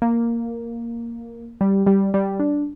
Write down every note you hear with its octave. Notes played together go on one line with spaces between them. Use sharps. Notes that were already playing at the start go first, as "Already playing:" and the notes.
A#3
G3
G3
G3
D4